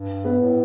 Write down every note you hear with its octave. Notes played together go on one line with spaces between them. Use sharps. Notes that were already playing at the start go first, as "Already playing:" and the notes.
Already playing: G2
B3
A2